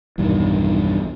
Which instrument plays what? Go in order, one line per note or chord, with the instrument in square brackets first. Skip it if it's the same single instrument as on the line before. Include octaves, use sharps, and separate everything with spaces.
[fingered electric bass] B1 E2 G2 D#3